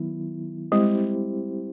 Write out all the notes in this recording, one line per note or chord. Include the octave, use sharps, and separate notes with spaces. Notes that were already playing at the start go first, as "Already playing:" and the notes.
Already playing: D#3 F#3 B3 E4
G3 G#3 C4 E4 G4 C5